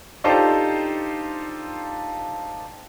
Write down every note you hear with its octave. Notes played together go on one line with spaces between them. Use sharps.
D4 D#4 F4 G4 A4 C5